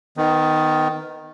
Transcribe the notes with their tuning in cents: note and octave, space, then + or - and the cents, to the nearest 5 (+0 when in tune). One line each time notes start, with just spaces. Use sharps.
D#3 +0 B3 +20